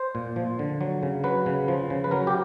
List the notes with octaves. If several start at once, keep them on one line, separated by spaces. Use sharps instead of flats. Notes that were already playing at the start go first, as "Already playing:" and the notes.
Already playing: C5
A#2
F3
D3
F#3
C#3
F#3 B4
C#3
F3
C#3
B4
F#3 A#4
G4